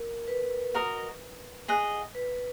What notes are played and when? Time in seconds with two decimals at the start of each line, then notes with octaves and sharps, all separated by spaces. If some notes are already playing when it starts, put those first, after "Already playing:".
Already playing: A#4
0.28 B4
0.74 F#4 A#4 D#5
1.68 G#4 D#5 F#5
2.15 B4